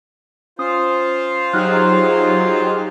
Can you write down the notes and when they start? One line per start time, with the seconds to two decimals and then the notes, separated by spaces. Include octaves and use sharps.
0.59 C#4 F4 C5 D#6
1.53 F#3 D#4 G4 G#4 F6 F#6